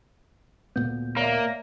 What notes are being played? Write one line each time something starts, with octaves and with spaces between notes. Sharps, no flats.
D2 A#2 B3 G6
A#3 C#5 D5 E5